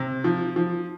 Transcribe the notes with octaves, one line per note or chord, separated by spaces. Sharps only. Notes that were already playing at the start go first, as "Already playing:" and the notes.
Already playing: C3
F3
F3